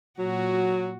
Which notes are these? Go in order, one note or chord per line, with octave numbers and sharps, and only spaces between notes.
A#2 F#3 F#4